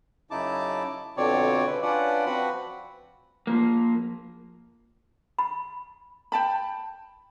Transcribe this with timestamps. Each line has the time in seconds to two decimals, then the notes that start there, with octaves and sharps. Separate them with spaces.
0.31 F#2 C#3 D#4 E4 A5 D6
1.17 F2 B2 D3 C4 C#5 D5
1.66 C#3 B4
1.82 C#4 D4 F4 B4 D5 F#5
2.26 F3 C4 F#4 B4 F#5 B5
3.47 F3 A#3
5.39 B5
6.32 G5 A5 B5